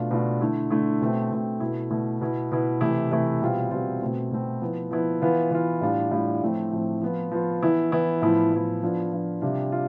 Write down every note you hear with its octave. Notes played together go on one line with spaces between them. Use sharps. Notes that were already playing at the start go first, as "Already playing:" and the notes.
Already playing: B2 A3 D4 F4
B2 A3 D4 F4
D3 A3 E4
D3 A3 E4
B2 A3 C4
B2 A3 C4
B2 A3 E4
B2 A3 E4
B2 B3 E4
B2 B3 E4
C3 E3 A3 E4
C3 E3 A3 E4
B2 G3 C4 F4
B2 G3 C4 F4
B2 A3 C4
B2 A3 C4
F3 B3 E4
F3 B3 E4
E3 B3 F4
E3 B3 F4
A2 G3 D4 F4
A2 G3 D4 F4
A2 F3 A3 C4
A2 F3 A3 C4
F3 B3 F4
F3 B3 F4
E3 B3 E4
E3 B3 E4
A2 F3 B3 E4
A2 F3 B3 E4
F3 B3 D4 F4
F3 B3 D4 F4
C3 G3 D4 F4
F4